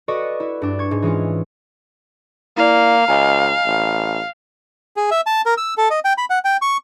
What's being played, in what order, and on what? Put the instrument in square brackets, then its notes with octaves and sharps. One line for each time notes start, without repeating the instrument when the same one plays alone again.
[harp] F#4 A4 B4 D5 D#5 C#6
E4
G2 D4
C#6 G#6
G#2
E3 G#3 C#4 F4
[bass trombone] A#3 [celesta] E4 D5 [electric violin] F5
[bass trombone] C#2 [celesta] D#5 G#5 A#5
[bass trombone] A1
[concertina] G#4
E5
A5
A#4
E6
A4
D#5
G5
B5
F#5
G5
C#6